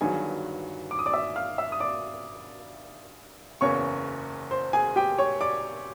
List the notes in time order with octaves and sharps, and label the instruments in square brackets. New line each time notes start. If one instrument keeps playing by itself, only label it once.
[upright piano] G1 G2 D#3 F#3 G#4 G#5
D6
D#6
D5 D6
E5 E6
F5 F6
E5 E6
D#6
D5 D6
F#1 E2 C#3 C#5 C#6
C5 C6
G#4 G#5
G4 G5
C#5 C#6
D5 D6